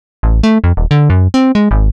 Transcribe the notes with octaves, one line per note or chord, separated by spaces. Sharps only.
A1
A3
F2
D#1
D3
F#2
C4
G#3
G#1